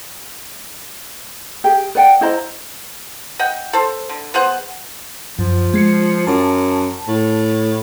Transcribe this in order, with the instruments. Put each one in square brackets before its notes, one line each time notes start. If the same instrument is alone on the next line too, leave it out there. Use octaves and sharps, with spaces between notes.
[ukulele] G4 G#4 G5
B4 D5 F#5 G5
E4 C5 D#5 A#5
[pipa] D#5 F#5 G5
A4 C5
D3
B3 G#4 C5 F#5
[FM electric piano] F#2 [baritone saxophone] F3
[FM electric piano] G#3 C7 C#7
[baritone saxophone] F#2 [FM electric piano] A5
[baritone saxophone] A2